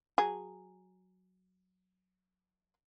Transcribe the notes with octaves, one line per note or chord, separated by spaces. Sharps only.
F#3 G#4